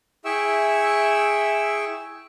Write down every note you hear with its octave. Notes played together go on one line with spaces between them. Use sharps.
E4 G#4 E5 G5 C#6 E6